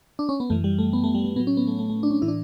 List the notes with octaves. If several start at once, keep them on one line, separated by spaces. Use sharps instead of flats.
D4
C#4
B3
F#2 E3 A3
G3
A3
B3
A3
G3
G3
A2 F#3 B3
C#4
B3
A3
A3
A3
D4
C#4
A2 E3 E4
D4